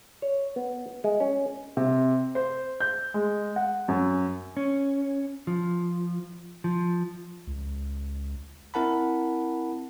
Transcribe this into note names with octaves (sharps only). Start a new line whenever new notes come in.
C#5
B3
G#3
C#4
C3
C5
G6
G#3
F#5
F#2
C#4
F3
F3
C#2
C4 E4 A#4 F#5 A5 B5